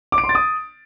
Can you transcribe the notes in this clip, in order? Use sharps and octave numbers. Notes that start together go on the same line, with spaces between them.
D6
D7
C6
A6
D#6